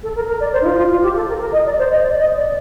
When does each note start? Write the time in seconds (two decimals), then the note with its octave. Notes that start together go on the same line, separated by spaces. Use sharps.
0.03 A4
0.15 A#4
0.27 A#4
0.40 D5
0.52 C5
0.61 D#4
0.65 F4
0.77 F4
0.91 F4
1.02 G4
1.15 A4
1.28 A#4
1.40 A#4
1.52 D#5
1.65 D5
1.78 C5
1.90 D#5
2.02 D5
2.19 D#5
2.37 D5